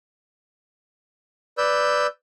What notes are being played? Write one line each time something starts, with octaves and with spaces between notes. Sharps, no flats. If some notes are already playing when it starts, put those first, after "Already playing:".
B4 D5 E6 G6